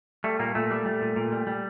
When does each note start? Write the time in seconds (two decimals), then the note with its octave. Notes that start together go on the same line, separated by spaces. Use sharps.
0.24 G3 A3
0.39 A#2 A#3
0.55 A#2 A3
0.71 G3
0.86 G3
1.01 A#2
1.16 A#2
1.32 G3
1.47 G3